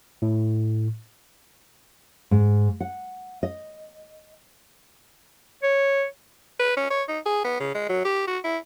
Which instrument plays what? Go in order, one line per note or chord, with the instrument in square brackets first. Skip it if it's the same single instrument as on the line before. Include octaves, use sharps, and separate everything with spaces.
[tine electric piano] A2
[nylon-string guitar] G#2
F#5
D#5
[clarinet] C#5
[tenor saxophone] B4
C#4
C#5
D#4
G#4
B3
C#3
G#3
F#3
G4
F#4
E4